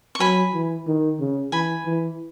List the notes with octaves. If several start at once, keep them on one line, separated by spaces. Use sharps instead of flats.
C#6
F#3 G#5 B5
E3
D#3
C#3
E3 G#5 B5
E3